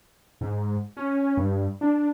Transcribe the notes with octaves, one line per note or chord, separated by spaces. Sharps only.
G#2
C#4
G2
D4